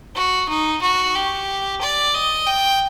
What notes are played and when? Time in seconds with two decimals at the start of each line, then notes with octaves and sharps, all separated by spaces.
0.15 F#4
0.49 D#4
0.82 F#4
1.15 G4
1.81 D5
2.14 D#5
2.47 G5